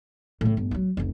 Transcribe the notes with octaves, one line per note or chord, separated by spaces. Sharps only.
A2 C#3
G1
F3 F#3
F1 C#2